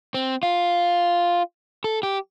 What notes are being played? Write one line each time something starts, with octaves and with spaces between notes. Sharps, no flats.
C4
F4
A4
G4